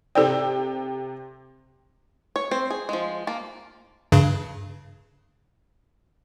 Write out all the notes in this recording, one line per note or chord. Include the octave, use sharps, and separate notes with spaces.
C3 A4 C5 D5 G5
C#5
C4 C5
G#4
F3 G#3
A#3 A5
G2 C#3